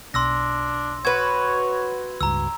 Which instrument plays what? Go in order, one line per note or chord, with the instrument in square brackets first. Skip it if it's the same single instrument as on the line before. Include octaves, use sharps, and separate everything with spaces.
[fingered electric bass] B1 [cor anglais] D4 [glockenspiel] C6 E6 A#6
[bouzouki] F#4 B4 [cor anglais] C#5 [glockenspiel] G#6
[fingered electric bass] C#2 G2 [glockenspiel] A#5 E6